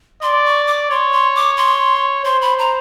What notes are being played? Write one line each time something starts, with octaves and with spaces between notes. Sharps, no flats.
D5 C6
C#6
D6
C#5 C6
C6
D6
C6
C5 C6
B5
A#5